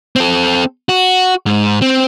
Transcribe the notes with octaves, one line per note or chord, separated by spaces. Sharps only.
C4 A4
F#4
G#2
C4